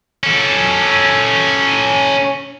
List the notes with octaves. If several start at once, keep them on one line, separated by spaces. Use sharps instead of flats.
C#4 A4